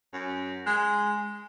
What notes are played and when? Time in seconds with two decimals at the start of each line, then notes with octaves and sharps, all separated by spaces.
0.13 F#2
0.67 G#3